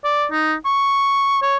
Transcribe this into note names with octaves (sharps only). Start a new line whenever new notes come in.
D5
D#4
C#6
C#5